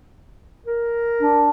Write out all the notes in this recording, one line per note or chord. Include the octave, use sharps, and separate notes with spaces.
A#4
D4